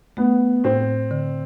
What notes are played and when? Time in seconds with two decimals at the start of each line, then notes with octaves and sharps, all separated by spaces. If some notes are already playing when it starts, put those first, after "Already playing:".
0.17 A3 B3
0.64 A2 C4
1.11 D3